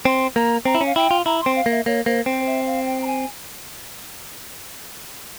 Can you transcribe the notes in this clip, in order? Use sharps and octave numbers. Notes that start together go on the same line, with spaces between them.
C4 C6
A#3 A#5
C4 A#5
E4
C#4
F5
E4 G5
F4
E4 A#5
C6
C4
F5
A#3
E5
A#3 C#5
A#3 C5
C4 C5
E5
F5
G5
A#5
G#5